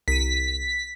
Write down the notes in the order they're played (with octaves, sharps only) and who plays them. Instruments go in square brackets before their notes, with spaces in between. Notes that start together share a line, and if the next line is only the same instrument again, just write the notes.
[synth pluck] C2 D#7 [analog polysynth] B6